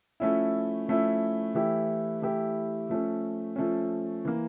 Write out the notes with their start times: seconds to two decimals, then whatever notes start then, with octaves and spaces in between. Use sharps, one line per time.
0.20 F3 A3 C#4 E4
0.88 F3 A3 C#4 E4
1.54 E3 A3 E4 G4
2.22 E3 A3 E4 G4
2.89 F3 A3 C#4
3.56 F3 A3 C#4
4.25 E3 A#3